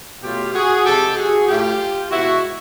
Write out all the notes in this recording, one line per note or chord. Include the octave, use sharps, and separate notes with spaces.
B2 F#3 A3 F4 G4
F#4 G#4
C3 F3 G#3 G4 A4
F#4 G#4
A2 F#3 A3 F4 G4
B2 G#3 E4 F#4